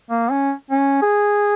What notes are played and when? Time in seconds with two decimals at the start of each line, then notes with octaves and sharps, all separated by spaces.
0.10 A#3
0.31 C#4
0.71 C#4
1.02 G#4